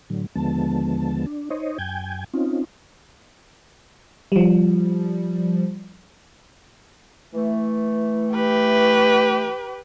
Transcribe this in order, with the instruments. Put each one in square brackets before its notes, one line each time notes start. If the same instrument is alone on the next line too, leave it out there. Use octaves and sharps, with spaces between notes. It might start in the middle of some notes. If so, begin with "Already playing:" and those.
[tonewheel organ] A2 D3 F#3
D#2 D3 F3 G#3 B3 A5
D4
D#4 C5 C#5 D#5
F#2 G5 G#5 G6 G#6
C4 C#4 D#4 F4
[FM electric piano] F3 G3
[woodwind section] E3 A3
[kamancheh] G4 B4